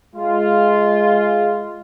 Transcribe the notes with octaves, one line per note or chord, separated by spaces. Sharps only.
G#3 F4